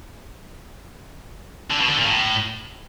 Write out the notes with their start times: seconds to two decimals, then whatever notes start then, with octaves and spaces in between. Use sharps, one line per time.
1.71 D3
1.79 B2
1.88 D3
1.97 A#2
2.06 A2